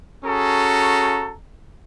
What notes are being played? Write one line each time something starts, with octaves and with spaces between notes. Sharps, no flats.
C#4 F#4 G#4 A4 A#5